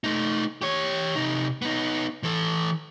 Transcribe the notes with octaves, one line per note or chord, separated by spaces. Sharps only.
A3 D#4
G4 C#5
C3 D#4
B3 D#4
E3 A4